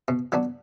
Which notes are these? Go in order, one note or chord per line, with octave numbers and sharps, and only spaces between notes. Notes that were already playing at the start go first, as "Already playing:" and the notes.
B2
F#3 B3 D4 F#4